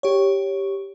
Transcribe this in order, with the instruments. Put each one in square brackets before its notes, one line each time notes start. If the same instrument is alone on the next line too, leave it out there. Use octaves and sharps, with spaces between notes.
[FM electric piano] G4 C#5